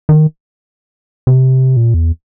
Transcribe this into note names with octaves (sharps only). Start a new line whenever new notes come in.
D#3
C3
A#2
E2